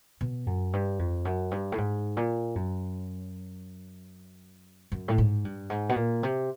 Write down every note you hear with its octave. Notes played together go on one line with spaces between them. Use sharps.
B2
F#2
G2
F2
F#2
G2
A2
G#2
A#2
F#2
F#2
A2
G#2
G2
G#2
B2
A#2
C3